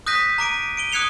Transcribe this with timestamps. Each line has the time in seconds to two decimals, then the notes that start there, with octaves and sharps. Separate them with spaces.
0.06 D#6 F#6 G6 A#6 B6 D#7
0.38 A#5 D6 D7 D#7
0.77 D7 D#7 G7
0.92 D#6 F#6 G#6 C#7 F7 G7